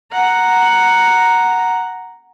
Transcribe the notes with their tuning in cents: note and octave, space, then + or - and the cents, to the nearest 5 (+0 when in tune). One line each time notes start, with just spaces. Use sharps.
F#5 +0 A#5 +0